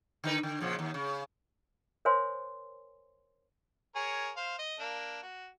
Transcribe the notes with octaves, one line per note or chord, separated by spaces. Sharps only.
D3 D#4 B4
D3
A#2 C#3 F3
D#2
C#3
A#4 C5 C#5 F5 G#5 C6
G#4 A#4 C#5
C5 F5
D#5
A#3 D4
F#4